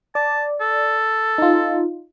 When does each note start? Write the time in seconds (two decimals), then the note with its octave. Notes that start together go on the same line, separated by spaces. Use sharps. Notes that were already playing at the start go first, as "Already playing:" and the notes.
0.15 D5 A5
0.61 A4
1.38 D#4 F4